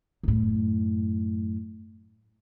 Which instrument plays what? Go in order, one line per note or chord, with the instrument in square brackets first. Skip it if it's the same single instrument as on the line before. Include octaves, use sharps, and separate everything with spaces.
[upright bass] F#2 A2